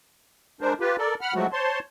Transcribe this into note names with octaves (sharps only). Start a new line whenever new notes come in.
G#3 D4 A#4 C5
F4 G4 B4
A4 A#4 D5
F#5 B5 F6
F3 F#3 G#3 A3 F#4
C5 C#5 A5 C6